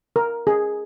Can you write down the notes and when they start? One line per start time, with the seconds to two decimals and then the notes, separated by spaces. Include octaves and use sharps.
0.16 A#4
0.47 G#4